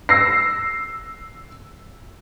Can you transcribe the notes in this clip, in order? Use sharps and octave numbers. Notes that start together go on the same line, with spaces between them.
E6 A#6 C7